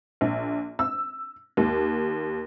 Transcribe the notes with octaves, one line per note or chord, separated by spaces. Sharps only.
A#1
E6
D#2